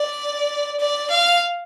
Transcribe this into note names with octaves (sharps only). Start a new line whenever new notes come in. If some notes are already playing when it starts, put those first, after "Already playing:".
Already playing: D5
D5
F5